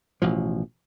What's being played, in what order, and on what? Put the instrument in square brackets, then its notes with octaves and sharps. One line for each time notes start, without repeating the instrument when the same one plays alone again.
[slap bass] A1 B2 F3